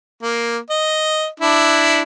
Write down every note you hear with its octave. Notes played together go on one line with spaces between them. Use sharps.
A#3
D#5
D4 E4